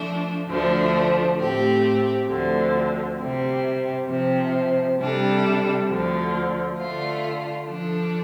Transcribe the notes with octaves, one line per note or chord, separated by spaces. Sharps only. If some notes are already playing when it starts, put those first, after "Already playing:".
Already playing: F3 A3 D4
D2 D3 F3 A3 D4
A2 A3 C4 G4
D2 D3 F3 C4
C3 G3 C4
C3 F3 C4
C3 G3 D4 A4
D2 D3 F3
D3 A3 F4
F3 D4 A4